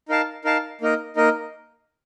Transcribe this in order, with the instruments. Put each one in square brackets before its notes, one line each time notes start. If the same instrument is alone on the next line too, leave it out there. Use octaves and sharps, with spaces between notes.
[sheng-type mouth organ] D#4 A#4 F5 A5
D#4 A#4 F5 A5
A#3 D#4 A#4 D#5
A#3 D#4 A#4 D#5